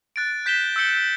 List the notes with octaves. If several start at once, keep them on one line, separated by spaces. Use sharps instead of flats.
F#6 A6 D7
G6 B6 E7 G7
E6 G6 C#7 G7